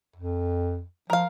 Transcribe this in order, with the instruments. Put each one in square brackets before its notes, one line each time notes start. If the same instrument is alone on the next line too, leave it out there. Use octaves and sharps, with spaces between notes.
[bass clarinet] F2
[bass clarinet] F3 [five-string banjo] A#4 F5